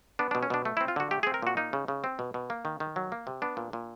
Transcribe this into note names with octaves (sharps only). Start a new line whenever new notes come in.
B3 D4
D4
B2
C#4
B2 D4
A3
E4
C4
F4
D3 F#4
A3 G4
G#4
C4
A#4
A#2 F#4
A#3 D#4
C#3
C#3
C4
B2
B2
A#3
D#3
D#3
F#3
A#3
C3
B3 D4
A#2
A#2